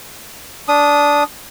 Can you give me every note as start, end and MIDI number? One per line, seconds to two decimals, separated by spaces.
0.68 1.23 62
0.68 1.23 87